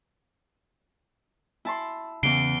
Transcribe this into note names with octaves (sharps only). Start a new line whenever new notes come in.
E4 A5 C6
E2 C#3 E3 C7 D7 G7